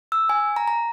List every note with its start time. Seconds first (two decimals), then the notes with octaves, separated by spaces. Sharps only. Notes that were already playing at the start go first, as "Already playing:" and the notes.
0.12 E6
0.29 G#5
0.56 A#5
0.68 A#5